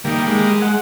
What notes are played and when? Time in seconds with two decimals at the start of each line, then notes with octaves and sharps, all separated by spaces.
0.05 D#3 G3 A#3
0.26 G#3
0.62 F#5